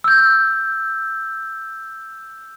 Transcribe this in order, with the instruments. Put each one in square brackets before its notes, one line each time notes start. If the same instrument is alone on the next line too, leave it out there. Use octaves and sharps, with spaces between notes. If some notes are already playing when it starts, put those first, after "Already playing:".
[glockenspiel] E6 G6